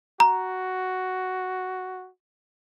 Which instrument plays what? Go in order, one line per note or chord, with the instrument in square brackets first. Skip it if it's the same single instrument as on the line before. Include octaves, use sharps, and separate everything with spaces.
[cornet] F#4 [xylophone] A#5